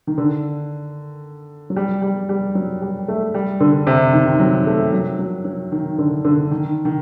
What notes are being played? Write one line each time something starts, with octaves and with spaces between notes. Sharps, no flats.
D#3
D3
F#3
G3
G3
G3
F#3
G3
A3
G3
D3
C3
D#3
F#3
A3
F#3
F#3
F#3
D#3
D3
D3
D#3
D#3